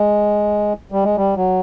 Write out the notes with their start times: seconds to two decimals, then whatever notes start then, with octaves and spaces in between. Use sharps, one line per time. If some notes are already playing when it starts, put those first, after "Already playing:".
Already playing: G#3
0.92 G3
1.04 G#3
1.16 G3
1.36 F#3